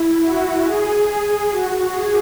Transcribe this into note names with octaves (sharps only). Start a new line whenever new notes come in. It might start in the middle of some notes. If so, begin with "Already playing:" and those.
Already playing: E4
F#4
G#4
G#4
F#4
G#4